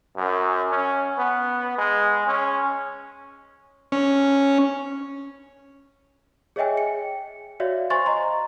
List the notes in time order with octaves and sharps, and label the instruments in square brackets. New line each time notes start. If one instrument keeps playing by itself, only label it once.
[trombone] F#2
C#4
B3
G#3
C#4
[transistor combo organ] C#4
[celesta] G#4 C#5 D#5 E5 G5 G#5
C#7
F#4 C#5 D5 E5 F5
C5 G#5 C6 C#6 A6
D#5 A#5 C6